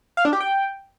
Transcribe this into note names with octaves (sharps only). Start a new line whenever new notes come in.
F5
D4
G4
G5